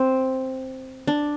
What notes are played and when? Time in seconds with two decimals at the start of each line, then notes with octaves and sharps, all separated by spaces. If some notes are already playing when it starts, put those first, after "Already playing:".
Already playing: C4
1.07 D4